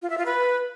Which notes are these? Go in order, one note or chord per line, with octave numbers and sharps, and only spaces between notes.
F4
E5
F4
B4